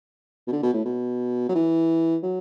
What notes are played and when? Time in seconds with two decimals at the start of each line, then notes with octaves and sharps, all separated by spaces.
0.47 B2
0.52 D3
0.63 B2
0.73 A2
0.85 B2
1.49 F#3
1.55 E3
2.23 F#3